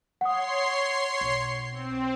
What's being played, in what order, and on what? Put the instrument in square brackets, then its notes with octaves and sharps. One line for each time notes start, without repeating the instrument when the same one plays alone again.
[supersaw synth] C#5 C6 C7 [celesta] F#5 D#6
[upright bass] B1
[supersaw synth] C4